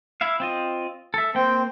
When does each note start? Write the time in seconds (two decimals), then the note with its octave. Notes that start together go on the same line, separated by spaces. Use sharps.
0.21 E4 E5 F5
0.40 C4 F4 D#5
1.14 A4 E5
1.35 A#3 C4 G5